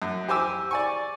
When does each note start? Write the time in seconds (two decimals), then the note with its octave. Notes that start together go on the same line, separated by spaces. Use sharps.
0.02 F#2
0.28 G4 C5 G#5 D6 E6
0.71 D5 G#5 C#6